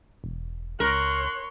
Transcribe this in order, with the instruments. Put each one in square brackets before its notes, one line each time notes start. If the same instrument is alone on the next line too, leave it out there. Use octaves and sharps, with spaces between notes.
[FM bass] E1
[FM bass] C#2 [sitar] A#4 [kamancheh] C#5 C6 [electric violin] F#6